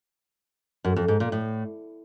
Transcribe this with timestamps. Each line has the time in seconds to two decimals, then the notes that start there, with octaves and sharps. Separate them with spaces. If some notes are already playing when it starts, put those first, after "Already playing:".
0.84 F#2
0.96 F2
1.08 G#2
1.20 A#2
1.32 A2